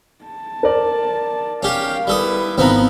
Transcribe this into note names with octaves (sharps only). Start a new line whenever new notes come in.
A5
A#4 D5
C#4 G4 F5
G3 E4 A4 B4 D#6
G#1 F3 B3 C4 D#4 A#5